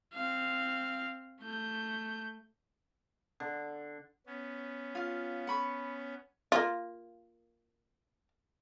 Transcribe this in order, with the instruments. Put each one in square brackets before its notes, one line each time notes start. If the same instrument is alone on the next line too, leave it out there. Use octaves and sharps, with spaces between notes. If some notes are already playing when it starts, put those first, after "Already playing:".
[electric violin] C4 F5
A3 G6
[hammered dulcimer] D3
[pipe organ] B3 C#4
[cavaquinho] F4 F5
F#5 B5 C#6
[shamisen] A#3 F4